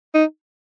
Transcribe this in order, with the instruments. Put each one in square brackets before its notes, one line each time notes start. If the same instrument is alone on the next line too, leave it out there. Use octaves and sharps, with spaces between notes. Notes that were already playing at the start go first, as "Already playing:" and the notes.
[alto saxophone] D#4